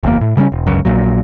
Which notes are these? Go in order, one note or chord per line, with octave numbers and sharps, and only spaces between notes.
F#1 E2 A#2 A#3
A2
C#3 G3 G#3 C#4
E1
G1 C#2 F#2
A#1 A#2 F#3